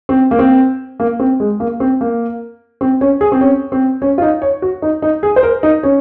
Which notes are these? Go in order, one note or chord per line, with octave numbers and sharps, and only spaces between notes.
C4
A#3
C4
A#3
C4
G#3
A#3
C4
A#3
C4
C#4
G#4
C4
C#4
C4
C#4
F4
D#4
C#5
F#4
D#4
D#4
G#4
C5
A#4
D#4
C#4